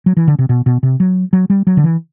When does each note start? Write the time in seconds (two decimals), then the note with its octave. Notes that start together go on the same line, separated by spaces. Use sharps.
0.06 F#3
0.17 E3
0.28 D3
0.39 C3
0.49 B2
0.66 B2
0.83 C3
1.00 F#3
1.33 F#3
1.50 G3
1.67 F#3
1.77 D3
1.84 E3